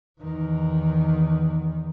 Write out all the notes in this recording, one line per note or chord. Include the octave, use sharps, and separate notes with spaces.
E2 D#3